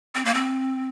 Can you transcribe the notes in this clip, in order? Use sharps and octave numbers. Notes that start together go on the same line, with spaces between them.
C4
A#3
C4